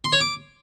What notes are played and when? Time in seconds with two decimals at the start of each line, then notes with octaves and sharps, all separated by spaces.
0.04 C6
0.12 C#5
0.21 D6